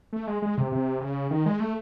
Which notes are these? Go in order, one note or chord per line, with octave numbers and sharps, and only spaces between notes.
A3
G#3
G#3
C3
C3
C#3
D#3
G#3
A3